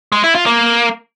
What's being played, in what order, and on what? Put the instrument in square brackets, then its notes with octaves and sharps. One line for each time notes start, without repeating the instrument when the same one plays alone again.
[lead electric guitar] G#3
E4
F4
A#3